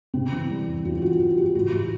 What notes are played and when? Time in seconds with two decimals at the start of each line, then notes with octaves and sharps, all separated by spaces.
0.14 C3 C4
0.32 E3
0.50 G3
0.67 E2
0.85 E2 F4
0.97 F4
1.02 E3 F#4
1.20 E3 F#4
1.37 E3 G4
1.55 A2 F#4
1.73 A2